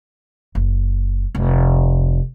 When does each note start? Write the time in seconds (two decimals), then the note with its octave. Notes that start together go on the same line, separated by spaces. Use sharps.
0.55 F#1
1.35 F1